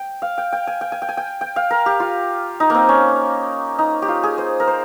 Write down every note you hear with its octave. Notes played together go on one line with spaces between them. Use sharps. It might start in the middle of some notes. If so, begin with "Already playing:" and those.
Already playing: G5
F5
G5
G5
G#5
G5
G#5
G5
G#5
G5
G5
F5
A#4
G4
F4
D#4
A#3 C4
C#4
D#4
G4
F4
G#4
C5
A#4
C5